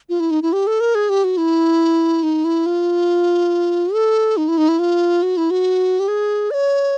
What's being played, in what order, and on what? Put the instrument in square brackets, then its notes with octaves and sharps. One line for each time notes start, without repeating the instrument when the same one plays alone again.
[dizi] F4
E4
D#4
E4
G4
A4
A#4
G#4
G4
F#4
E4
D#4
E4
F4
A4
D#4
E4
D#4
E4
F4
F#4
E4
F#4
G4
G#4
D5
C#5